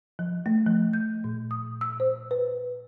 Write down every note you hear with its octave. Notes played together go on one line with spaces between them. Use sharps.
F3
A3
F3
G6
A#2
D#6
E6
C5
B4